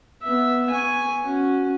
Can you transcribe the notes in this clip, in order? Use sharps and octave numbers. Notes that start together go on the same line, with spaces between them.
B3 E5
G#5 C#6
C#4 F#4